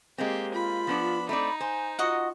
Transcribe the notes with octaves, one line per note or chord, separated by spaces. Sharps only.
G#3 A#3 C4 G4
F4 B5
F3 B3 D4
A3 C4 D#4 D5 B5
C5 G#5
F4 F#4 D#5 F#5